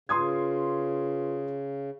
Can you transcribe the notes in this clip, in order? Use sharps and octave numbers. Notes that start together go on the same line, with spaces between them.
C#3 F4 B4 C6 D#6 G#6